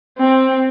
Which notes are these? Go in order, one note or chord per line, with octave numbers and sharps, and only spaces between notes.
C4